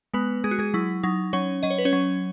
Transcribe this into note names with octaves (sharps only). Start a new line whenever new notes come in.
G#3 B3 B4
G#3 G#4
F#4
G#3 G#4
F#3 E4
F#3 D#4
F#3 C#4 C#5
F#3 D#5
C#5
B4
C#4 C#5
F#3